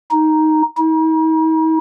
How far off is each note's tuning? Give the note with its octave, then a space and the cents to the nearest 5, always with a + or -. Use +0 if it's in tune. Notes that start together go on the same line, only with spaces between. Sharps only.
D#4 +5
D#4 +45